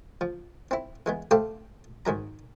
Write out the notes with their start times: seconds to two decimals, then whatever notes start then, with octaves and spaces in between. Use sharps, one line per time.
0.21 F3
0.71 C4 E4
1.06 E3 G#3 B3
1.31 A3 G4 A4 C5 F5 G5
2.06 G#2 D#3 F#3 A#5